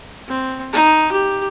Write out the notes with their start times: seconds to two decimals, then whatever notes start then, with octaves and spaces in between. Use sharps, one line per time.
0.28 C4
0.73 D#4
1.11 G4